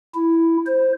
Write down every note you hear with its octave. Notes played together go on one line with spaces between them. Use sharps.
E4
C5